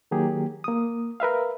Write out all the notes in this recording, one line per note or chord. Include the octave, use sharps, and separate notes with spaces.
D#3 F#3 A#3 G4 G#4
A#3 D#6
A#4 B4 E5 F5